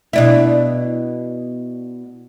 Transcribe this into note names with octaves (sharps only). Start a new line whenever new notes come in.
B2 D4 E4